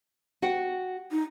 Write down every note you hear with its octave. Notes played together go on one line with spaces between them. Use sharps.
F#4 F#5 G5
D#4